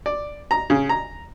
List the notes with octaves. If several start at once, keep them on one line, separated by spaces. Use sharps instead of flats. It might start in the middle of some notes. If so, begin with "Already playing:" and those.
D5
A#5
C#3
A#5